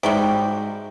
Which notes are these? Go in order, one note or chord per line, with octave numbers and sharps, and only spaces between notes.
G#2 C3 F#3 G3